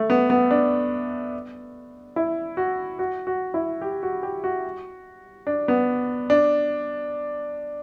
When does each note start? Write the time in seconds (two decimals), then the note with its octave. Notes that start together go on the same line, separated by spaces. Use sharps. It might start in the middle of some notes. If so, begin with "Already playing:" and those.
Already playing: A3
0.10 B3
0.30 B3
0.51 D4
2.16 E4
2.57 F#4
2.99 F#4
3.27 F#4
3.54 E4
3.82 G4
4.03 F#4
4.23 G4
4.44 F#4
5.47 D4
5.68 B3
6.30 D4